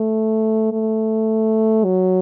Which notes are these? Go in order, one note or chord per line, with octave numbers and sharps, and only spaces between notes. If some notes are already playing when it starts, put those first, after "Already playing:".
Already playing: A3
A3
F#3